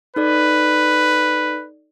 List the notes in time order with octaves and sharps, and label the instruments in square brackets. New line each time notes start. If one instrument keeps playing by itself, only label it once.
[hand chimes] D#4 A4 D5 [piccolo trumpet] B4